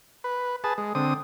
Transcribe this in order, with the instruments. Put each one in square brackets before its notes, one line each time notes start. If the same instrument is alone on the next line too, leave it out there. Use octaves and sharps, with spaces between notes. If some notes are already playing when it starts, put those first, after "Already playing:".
[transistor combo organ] B4
G#4 B4 A5
G#3
D3 C4 D#6